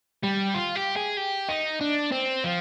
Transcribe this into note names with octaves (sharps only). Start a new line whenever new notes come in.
G3
F4
G4
G#4
G4
D#4
D4
C4
F3